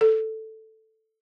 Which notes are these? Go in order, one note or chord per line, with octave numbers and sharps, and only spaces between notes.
A4